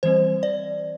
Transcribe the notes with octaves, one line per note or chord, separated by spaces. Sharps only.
E3 G3 C4 C5
D5